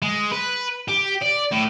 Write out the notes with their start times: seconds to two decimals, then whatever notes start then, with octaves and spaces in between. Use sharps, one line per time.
0.02 G#3
0.31 B4
0.88 G4
1.22 D5
1.52 A2